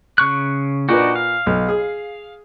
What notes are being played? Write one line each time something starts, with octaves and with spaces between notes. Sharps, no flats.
C#3 C#6 F#6
A#2 D4 D#4 F#4 B4
F5
B1
G#4